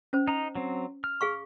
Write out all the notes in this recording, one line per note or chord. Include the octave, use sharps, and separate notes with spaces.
C#4 C5
D#4 A#5
F#3 C4
F6
G#4 F5 C#6